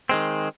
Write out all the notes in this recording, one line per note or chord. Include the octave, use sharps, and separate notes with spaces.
D#3 G#3 C4